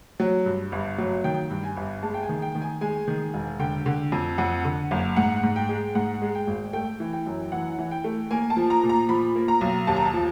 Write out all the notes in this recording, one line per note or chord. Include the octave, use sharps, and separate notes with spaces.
F#3
G2
G1
F#3
D#3 G5
G2
G#5
G1
G#3 A5
G5
G#5
D#3
G5
D#3
G#5
G#3 G#5
D#3
E1
D3 G5
D3
F2
F2 F#5
D3
F#1
G#2 F#5
G#2
G5
G#3
G#2 F#5
G#3
G5
G#1
A3 G5
E3
G5
F#2
E3 F#5
E3
G5
A3
A#3 G#5
A5
F3
A#5
A#2
A#5
F3 B5
A#3
A#5
B1
D#2 A5
A#5
A5
F3